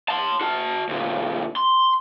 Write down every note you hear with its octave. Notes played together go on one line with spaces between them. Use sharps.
A5 C6
F#4 A5
D2 A#2
C6